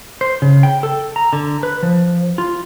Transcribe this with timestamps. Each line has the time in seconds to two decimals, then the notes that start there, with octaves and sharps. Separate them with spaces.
0.21 C5
0.42 C#3
0.63 G5
0.83 A4
1.16 A#5
1.33 D3
1.63 B4
1.83 F3
2.38 F4